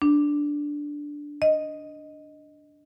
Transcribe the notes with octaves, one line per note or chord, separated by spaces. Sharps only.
D4
D#5